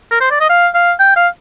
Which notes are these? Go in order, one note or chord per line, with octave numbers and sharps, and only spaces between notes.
A#4
C5
D5
D#5
F5
F5
G5
F5